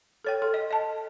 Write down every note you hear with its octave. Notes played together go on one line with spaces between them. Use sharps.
A4 C#5 G5
A4 C6
D#5
D#5 A5